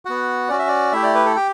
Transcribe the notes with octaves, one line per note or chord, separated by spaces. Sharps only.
B3 F#4 F#5
C#4 F#4 D5
E5
D5
A3 E4 G4 E5
D5
B4
A4
G4 G5